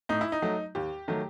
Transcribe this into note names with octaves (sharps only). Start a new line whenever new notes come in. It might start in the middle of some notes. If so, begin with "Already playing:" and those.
A2 D#4
E4
D#4
F#3 A3
D#2 G4
D#3 F#3 A3